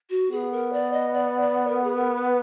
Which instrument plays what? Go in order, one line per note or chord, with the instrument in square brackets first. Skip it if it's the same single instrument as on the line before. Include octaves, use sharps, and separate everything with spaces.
[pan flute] F#4
[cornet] B3 [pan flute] G#4
[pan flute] A#4
D5
D#5
D5
D5
A#4
G#4
A#4
B4